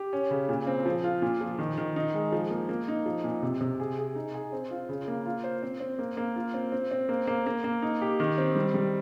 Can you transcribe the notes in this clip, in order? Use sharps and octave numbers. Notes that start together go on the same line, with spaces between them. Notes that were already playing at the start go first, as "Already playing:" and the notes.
Already playing: G4
C#4
C#3
A#2
C4
F3
F4
A#2
F3
D#3
D#3
D#4
G#3
F3
A#3
A#3
D#4
F3
A#2
C3
C3
G#4
G#4
D#4
G#4
C4
F4
C#3
A#3
F4
C5
C4
C4
A#3
A#3
F4
C4
C4
C4
A#3
A#3
A#3
A#3
D#4
G4
D#3
C4
G3
G3